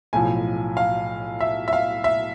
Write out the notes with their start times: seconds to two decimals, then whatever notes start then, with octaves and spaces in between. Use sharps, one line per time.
0.13 B1 A2 F3 G#5
0.77 F5
1.41 E5
1.68 E5
1.73 F5
2.04 E5